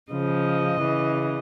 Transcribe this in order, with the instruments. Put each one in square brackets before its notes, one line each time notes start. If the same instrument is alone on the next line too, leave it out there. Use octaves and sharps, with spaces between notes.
[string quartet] C#3 F3 D#5
C#3 E3